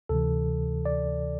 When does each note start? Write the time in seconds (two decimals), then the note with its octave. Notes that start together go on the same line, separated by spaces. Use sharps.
0.09 D2 C3 E3 A4
0.86 D5